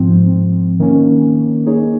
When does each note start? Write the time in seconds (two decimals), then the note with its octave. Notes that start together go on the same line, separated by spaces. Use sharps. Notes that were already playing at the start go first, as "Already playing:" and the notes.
Already playing: G#2 F3 C4
0.80 D#3 A#3 C#4
1.66 A#3 D#4 G#4 C#5